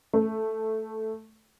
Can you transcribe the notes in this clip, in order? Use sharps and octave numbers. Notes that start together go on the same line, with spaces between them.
A3